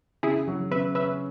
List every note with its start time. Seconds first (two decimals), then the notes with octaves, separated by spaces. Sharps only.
0.23 C#3 E4 G#4
0.47 F#3
0.71 C#3 B4 E5
0.95 C#4 B4 E5